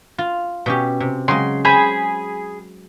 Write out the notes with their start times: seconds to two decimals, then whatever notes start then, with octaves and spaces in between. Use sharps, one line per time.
0.18 F4
0.66 B2 C#4 G4
1.00 C3
1.28 C#3 F#3 G#3 C6
1.65 G#4 C5 B5